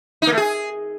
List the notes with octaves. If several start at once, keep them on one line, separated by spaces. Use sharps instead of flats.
D#4
A#3
A3
G#4